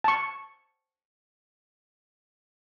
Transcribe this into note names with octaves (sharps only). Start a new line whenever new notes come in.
A5 C#6